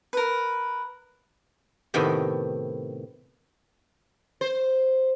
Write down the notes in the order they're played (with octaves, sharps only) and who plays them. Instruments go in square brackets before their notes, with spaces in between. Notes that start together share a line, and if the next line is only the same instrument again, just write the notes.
[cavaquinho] A#4 B4
[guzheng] A2 C3 D#3 A3 B3
[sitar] C5